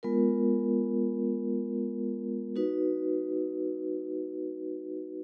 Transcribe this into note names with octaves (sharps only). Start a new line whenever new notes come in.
G#3 B3 F4 A#4
D#4 F#4 B4